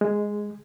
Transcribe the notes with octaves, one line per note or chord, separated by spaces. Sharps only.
G#3